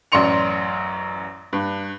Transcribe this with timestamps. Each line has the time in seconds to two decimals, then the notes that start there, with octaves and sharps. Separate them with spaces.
0.12 A1 F#2 D5 C6 C#7 F7
1.53 G2